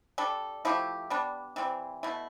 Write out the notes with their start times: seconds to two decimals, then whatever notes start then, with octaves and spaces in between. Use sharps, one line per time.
0.18 G3 D4 A4
0.65 F3 A3 E4 G4
1.10 G3 B3 D4
1.56 E3 G3 C4
2.03 B2 A3 E4